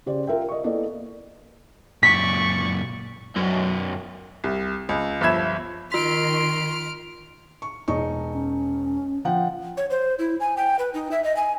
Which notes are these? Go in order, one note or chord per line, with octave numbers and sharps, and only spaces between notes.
C#3 G4 C5 D5
F4 A#4 E5 G5
D#5 C#6
A#3 B3 E4 A4 D5 D#5
F#2 A#2 D5 C#6 B6
B1 F#2
C2
C#2
G1 F3 E5 B5 G#6 E7
D#3 F4 C6 F6 B6 D7
C#6
E1 D#4 C#6
C#4
F3 F#5 G5
C#5
C5
E4
G#5
G5
B4
D#4
E5
D#5
G#5